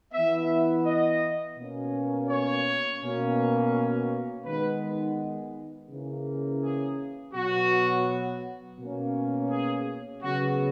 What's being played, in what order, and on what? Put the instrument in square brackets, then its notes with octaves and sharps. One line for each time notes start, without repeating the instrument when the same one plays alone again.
[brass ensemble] E3 B3 E5
D#5
B2 A#3 C#4
C#5
B2 A#3 C#4
D#3 G#3 B3 B4
C#3 E3 A#3 C#4
G#4
B2 F#3 B3 F#4
B2 A#3 C#4
G#4
C#3 F#3 B3 F#4